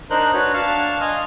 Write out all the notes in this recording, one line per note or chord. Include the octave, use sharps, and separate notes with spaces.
D4 D#4 A#4 C5 F#6 G6
D4 F#4 B4 C#5
D4 F5 A5 C#6 F6
D#5 F5 G#5 C6 F6